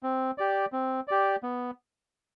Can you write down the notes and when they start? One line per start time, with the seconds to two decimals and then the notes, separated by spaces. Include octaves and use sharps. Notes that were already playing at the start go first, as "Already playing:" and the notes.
0.03 C4
0.38 G4 D5
0.72 C4
1.08 G4 D5
1.43 B3